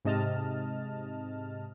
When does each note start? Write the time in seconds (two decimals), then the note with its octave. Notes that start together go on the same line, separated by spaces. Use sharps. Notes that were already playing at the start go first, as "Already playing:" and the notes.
0.05 G#2 C3 D#5 A5 F6